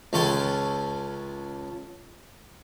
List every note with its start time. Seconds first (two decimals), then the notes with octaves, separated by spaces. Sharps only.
0.13 C#2 C#4 A4 G5 C6